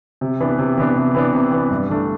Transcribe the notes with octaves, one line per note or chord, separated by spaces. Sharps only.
C3
E3 B3 D4
C3
E3 B3 D4
C3
E3 B3 D4
C3
E3 B3 D4
G2
E3 A3 D4